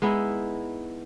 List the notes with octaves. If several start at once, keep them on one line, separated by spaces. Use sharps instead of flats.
G#3 B3 D#4 E4